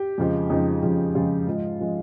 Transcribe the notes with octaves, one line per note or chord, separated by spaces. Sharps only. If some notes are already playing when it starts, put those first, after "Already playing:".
Already playing: G4
F2 C#3 F3 G#3
F2 C#3 F3 G#3 D#4
F2 C#3 F3 G#3
F2 C#3 F3 G#3 F4
G#2 F3 G#3
F3 G#3